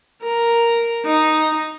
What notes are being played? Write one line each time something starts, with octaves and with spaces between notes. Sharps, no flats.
A#4
D#4